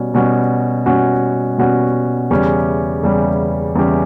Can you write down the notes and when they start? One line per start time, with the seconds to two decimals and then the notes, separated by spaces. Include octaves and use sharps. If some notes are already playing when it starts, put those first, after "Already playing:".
Already playing: B2 G3 C#4 F#4
0.14 B2 G3 C#4 F#4
0.86 B2 G3 C#4 F#4
1.58 B2 G3 C#4 F#4
2.30 E2 C#3 G3 C#4 G4
3.03 E2 C#3 G3 C#4 G4
3.75 E2 C#3 G3 C#4 G4